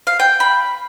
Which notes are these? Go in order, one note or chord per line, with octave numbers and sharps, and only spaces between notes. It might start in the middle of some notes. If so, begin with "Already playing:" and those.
F5
G5
B5